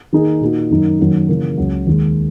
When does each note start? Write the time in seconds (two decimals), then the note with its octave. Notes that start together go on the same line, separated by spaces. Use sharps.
0.13 D#3 A#3 D#4 G#4
0.41 A#2 A#3 D#4 F#4
0.70 F#2 D#3 A#3 D#4
0.99 F#2 D#3 F#3 A#3
1.29 C#3 E3 A#3
1.57 C#2 C#3 F#3
1.87 D#2 D#3 G#3